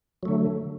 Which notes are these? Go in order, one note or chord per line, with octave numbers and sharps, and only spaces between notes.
D3 F#3 A3